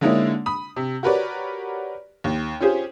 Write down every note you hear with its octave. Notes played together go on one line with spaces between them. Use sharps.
D3 G#3 A#3 C#4 D#4 E4
B5 D#6
C3
F#4 G4 A#4 B4 C#5 D5
D#2
C#4 F4 G4 G#4 C5